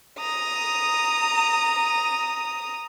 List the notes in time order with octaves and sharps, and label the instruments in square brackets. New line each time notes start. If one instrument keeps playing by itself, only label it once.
[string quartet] A#5 D#6